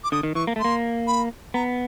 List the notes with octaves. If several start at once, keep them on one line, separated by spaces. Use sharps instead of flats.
D6
D3 D#6
D#3
E3 C#6
A#3
A3
A#3 C6
B5
B3 A#5